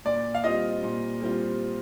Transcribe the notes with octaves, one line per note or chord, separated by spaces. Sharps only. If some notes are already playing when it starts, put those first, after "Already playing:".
A#2 D5
F5
G3 C4 F4 D#5
A#2
G3 C4 F4